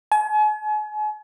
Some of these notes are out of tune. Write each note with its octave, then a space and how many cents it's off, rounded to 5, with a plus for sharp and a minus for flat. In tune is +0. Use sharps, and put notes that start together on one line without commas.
G#5 +40